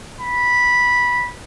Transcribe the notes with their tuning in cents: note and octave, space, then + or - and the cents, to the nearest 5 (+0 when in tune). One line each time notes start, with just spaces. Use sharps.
B5 -10